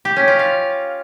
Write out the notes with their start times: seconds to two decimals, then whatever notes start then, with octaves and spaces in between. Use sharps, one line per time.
0.05 G4
0.16 C#4
0.28 F4
0.39 F5